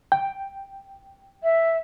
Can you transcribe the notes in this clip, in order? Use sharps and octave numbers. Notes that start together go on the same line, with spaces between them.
G5
E5